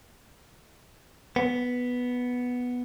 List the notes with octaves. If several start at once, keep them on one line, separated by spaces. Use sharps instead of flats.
B3